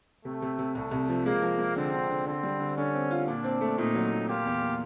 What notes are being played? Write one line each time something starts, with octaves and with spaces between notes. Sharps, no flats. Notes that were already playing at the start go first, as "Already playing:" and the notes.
C3 A3
C3
C3
C2 A3
C2
F3
G#3 A#3
F3
G#3
D3 C4
D3
D3
D3 C4
G3
D3
D3 C#4
C4
F4
A#2 D4
C4
A3
A#2 D#4
F#3
A#2
A#3 F4 G4
E2
A#3